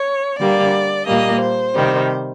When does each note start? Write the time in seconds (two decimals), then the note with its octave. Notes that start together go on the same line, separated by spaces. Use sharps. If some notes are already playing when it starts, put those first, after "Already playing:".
Already playing: C#5
0.39 D3 G3 A#3 D5
1.07 A#2 G3 A#3 D#5
1.40 C5
1.75 C3 D#3 G3